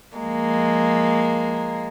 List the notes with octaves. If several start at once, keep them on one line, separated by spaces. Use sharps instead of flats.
F3 G#3 A#3